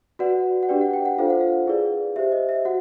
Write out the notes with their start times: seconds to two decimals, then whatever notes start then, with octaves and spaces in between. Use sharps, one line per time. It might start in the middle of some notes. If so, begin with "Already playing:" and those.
0.19 F#4 B4 D5 F#5
0.63 F#5
0.69 D4 G4 B4 D5 G5
0.81 F#5
0.93 G5
1.06 F#5
1.18 D4 F4 A4 C5 F5
1.30 F#5
1.41 F5
1.67 E4 G#4 B4 D5
2.16 G4 C5 E5
2.32 D#5
2.49 E5
2.65 F#4 F#5